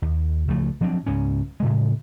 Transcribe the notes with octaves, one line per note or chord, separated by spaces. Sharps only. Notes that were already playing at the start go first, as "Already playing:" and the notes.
D#2
C#2 F3 A3
F3 F#3 C4 D4
C#2 G#2 C#4
A2 C#3 G#3